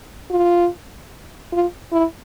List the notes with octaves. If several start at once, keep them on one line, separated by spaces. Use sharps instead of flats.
F4
F4
E4